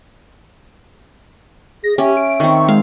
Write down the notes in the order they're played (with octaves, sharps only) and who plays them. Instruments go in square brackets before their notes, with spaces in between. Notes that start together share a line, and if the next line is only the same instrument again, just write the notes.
[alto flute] G#4 [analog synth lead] A#6
[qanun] C#4 [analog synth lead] G4 [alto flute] E5
[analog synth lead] D7
[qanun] D#3 C4 [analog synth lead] C#6
[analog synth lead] G#3 [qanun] F5